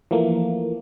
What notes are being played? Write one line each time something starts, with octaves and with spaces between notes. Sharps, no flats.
E3 F3 A3 A#3